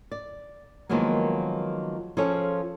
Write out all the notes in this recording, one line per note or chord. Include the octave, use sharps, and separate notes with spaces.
D5
D#3 F3 F#3 G#3 A#3 B3
F3 C#4 F4 G#4 A4 C#5